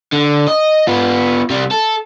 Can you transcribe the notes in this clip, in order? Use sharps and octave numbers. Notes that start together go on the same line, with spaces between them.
D3
D#5
B3 F4
C3 G3
A4